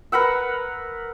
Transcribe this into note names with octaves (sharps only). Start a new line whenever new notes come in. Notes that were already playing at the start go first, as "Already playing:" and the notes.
A#4 B4 F#5 E6